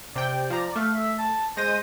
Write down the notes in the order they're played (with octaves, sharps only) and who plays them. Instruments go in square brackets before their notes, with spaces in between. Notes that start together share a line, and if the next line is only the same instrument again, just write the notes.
[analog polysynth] C3 G5 [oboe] D5
[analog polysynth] F3 A#5
[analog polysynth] A3 [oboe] F5
[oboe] E5
A5
[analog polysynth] G#3 A#6 D#7 [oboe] C5